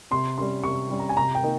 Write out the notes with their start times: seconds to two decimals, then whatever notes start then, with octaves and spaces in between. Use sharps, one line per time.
0.11 C3 C6
0.38 G3 C#4 C6
0.64 C3 C#6
0.90 G3 C#4
0.99 A#5
1.09 G#5
1.17 C3 A#5
1.35 G5
1.43 D#3 A#3 D#4